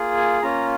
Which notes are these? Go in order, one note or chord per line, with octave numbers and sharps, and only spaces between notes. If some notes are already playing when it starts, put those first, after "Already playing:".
Already playing: A#3 F4 G#4
G#5
A#3 C#4 F4 A#5